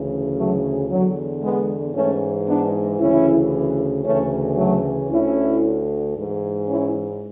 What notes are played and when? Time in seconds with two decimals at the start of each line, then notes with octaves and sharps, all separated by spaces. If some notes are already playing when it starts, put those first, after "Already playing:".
Already playing: D2 C#3 E3
0.35 F#3 A3
0.88 E2 D3 F#3
1.41 G#3 B3
1.94 G#2 E3 A3 C#4
2.46 B3 D4
2.99 D2 C#3 E3 C#4 E4
4.04 D2 C#3 E3 A3 C#4
4.57 F#3 A3
5.09 D2 D3 C#4 E4
6.15 G#2 E3
6.67 C#4 E4